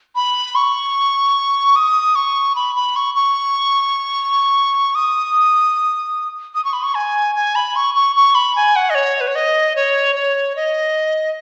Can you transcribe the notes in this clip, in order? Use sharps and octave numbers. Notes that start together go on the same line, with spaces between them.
B5
C#6
D#6
C#6
B5
B5
C#6
C#6
D#6
D#6
C#6
B5
C#6
G#5
G#5
B5
C#6
C#6
C#6
B5
G#5
F#5
D#5
C#5
B4
C#5
D#5
C#5
C#5
D#5